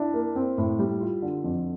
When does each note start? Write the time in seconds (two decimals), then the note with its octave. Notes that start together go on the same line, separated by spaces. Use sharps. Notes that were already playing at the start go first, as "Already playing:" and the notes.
Already playing: D4 E4
0.14 A#3
0.36 C4
0.58 A2
0.79 G3
1.00 F4
1.22 D3
1.44 F2